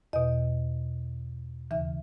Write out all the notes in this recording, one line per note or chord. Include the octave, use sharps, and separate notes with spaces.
E2 B2 D#5
D#2 C#3 E3 E5